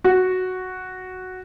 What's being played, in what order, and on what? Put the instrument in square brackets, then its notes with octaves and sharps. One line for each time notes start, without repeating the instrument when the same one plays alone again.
[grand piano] F#4